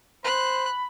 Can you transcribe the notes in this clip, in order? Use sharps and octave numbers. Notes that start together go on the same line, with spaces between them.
C5 B5 F#6